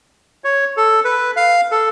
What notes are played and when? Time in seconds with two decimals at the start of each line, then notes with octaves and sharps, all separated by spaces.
0.44 C#5
0.77 A4
1.05 B4
1.36 F5
1.71 A4